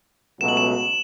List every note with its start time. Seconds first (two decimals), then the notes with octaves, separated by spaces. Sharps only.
0.40 C#2 B2 F#3 A3 E7
0.48 F#7
0.57 E7